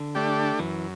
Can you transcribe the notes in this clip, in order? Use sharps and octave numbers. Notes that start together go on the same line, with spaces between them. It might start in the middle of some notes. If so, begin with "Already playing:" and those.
Already playing: D3
A3 D4 G4
F#2 E3